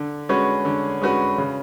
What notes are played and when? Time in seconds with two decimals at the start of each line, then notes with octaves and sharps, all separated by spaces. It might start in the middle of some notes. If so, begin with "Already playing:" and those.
Already playing: D3
0.29 G#3 C#4 F#4 B4
0.65 D3
1.02 G#3 C#4 F#4 B4
1.38 C#3